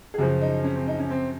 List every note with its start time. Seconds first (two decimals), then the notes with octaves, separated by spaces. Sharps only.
0.14 G#4
0.18 F#2 C#3 F3 F#4
0.41 D#4
0.64 C#4
0.76 C4
0.87 D#4
0.99 C#4
1.10 C4